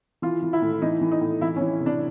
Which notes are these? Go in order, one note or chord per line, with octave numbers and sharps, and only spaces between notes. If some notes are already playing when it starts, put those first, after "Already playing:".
E3 F4
E3
E4
A2
E3 D#4
E3
D#4
A2
E3 E4
C#4
E3
C3
D4